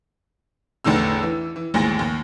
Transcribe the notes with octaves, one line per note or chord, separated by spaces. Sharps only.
A1 E2 D3 D#4 E6
E3
E3
A1 D#2 G#2 G#5 A#6
D#2